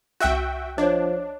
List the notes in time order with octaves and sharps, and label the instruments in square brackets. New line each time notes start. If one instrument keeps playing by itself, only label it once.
[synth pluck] C2 F#6 [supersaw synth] F#4 E5 G5
[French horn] F3 [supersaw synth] D4 [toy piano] C#5 D#5